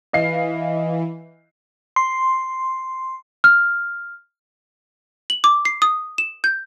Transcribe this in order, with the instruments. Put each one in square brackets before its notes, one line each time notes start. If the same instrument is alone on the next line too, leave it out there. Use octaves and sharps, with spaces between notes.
[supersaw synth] E3 [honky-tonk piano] D#5 F5 C7
[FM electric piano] C6
[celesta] F6
[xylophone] F#7
D6
C7
D#6
E7
G6